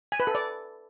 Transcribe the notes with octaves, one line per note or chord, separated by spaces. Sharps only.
G#5
B4
A4
D5